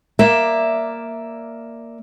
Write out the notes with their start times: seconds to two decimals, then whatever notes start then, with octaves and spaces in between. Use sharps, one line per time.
0.19 A#3 D5 E5